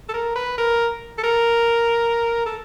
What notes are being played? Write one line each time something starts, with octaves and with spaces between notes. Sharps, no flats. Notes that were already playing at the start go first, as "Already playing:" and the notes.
A4
A#4
B4
A#4
A4
A#4
A4